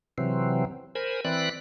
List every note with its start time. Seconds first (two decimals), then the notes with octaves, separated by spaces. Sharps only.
0.18 C3 E3 F#3 C4
0.95 A#4 C5 G#5 B5
1.25 E3 C4 D5 B5 F#6